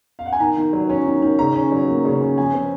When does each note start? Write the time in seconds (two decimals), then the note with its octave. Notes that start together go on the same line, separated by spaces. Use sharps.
0.19 F5
0.26 F#5
0.32 G#5
0.40 D#3 A#5
0.57 D#3
0.73 F#3
0.89 C#4
1.06 D#3
1.22 D#3
1.39 C#3 A#5
1.55 C#4
1.72 F#3
1.88 A#3
2.05 C#3
2.21 C#4
2.38 F3 G#5
2.54 C4